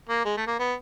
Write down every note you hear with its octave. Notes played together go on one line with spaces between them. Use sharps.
A#3
G#3
A3
A#3
B3